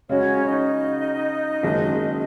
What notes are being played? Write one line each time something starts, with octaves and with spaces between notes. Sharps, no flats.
C#3 G#3 C#4 F#4 C#5
D#4 D#5
F#1 F#2 D#3 G#3 C#4